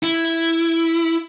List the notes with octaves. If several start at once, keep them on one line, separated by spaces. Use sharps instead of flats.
E4